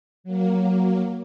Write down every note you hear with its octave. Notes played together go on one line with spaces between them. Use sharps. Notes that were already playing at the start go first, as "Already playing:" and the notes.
F#3 A#3